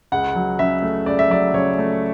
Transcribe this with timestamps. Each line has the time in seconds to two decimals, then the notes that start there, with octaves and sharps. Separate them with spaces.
0.12 C#2 F#5
0.35 F#3
0.59 C#3 E5
0.82 A3
1.06 C#2 D5
1.19 E5
1.30 F#3 D5
1.54 C#3 C#5
1.78 A3